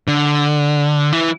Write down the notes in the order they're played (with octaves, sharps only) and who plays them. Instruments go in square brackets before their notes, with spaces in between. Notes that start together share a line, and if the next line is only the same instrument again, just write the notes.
[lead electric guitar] D3
E3